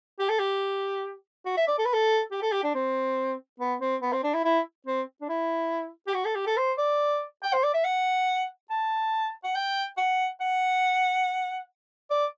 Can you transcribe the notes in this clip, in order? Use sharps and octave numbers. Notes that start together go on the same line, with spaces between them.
G4
A4
G4
F#4
E5
D5
A4
B4
A4
G4
A4
G4
D4
C4
B3
C4
B3
C4
D4
E4
E4
C4
D4
E4
G4
F#4
A4
G4
A4
C5
D5
G5
C5
D5
E5
F#5
A5
F#5
G5
F#5
F#5
D5